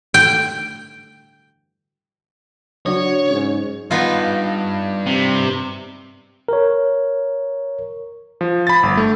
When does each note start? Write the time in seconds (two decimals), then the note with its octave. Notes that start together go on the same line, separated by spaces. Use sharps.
0.14 G5
2.86 C#3 F#3 D4 F#4 C#5
3.30 G#2 C#4
3.91 G2 B3 D#4 F4
5.06 C3
6.48 A#4 C#5
8.41 F3
8.67 B5 A6
8.83 G1
8.97 A3